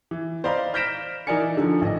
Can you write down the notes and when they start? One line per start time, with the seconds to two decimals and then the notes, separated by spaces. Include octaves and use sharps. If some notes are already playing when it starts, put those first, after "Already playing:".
0.11 E3
0.44 C5 D5 D#5 F5 A#5 B5
0.74 F6 G6 A#6 B6 D7 E7
1.27 E3 D#4 A#4 D5 G#5 C#7
1.57 D3 D#3 F3
1.82 A1 D#5